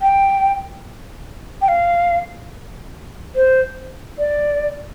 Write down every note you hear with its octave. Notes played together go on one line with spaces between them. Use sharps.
G5
G5
F5
C5
D5